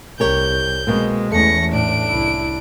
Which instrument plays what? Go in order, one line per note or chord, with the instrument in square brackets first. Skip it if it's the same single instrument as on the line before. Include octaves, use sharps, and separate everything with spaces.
[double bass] C2 [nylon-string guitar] G4 A#4 C#5 [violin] G6
[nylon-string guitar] B2 A#3 C4 [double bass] G#3
[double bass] E2 E3 [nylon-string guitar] A3 C#4 [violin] A#6 C#7
[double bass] A2 [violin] D4 D7
[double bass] C2 E4